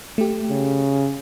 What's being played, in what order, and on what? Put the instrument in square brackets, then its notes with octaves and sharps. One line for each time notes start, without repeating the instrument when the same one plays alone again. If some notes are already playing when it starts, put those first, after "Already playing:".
[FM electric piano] A3 G4
[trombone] C#3